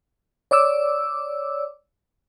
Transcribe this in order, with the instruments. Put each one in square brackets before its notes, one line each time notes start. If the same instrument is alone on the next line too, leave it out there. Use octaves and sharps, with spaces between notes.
[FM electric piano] C#5 D5 D6 E6